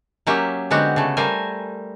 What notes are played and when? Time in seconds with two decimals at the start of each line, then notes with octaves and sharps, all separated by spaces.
0.27 F#3 A#3 C#4 G4 E5
0.70 D3 G#3 B3 C4 F#4 G4
0.96 C#3 A3
1.17 G3 A3 A#4 C5 G#5